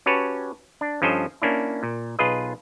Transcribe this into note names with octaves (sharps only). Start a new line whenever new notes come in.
C#4 F#4 G4 B4 C#5 A5
D4
G2 F3 C#4 A4 C5 D#5
A#3 C#4 D4 E4
A#2
B1 F4 G#4 B4 D#5